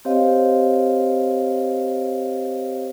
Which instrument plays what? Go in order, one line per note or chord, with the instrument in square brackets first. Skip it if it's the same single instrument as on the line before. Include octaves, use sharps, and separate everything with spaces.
[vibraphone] C4 G4 C5 C#5 D#5 F5